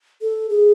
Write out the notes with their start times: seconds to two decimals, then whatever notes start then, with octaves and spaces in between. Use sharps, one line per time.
0.21 A4
0.49 G#4